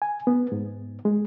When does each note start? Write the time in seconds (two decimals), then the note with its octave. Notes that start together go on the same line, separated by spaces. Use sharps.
0.02 G#5
0.27 B3
0.52 G#2
1.05 G#3